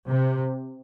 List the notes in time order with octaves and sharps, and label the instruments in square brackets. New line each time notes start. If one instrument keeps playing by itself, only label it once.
[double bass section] C3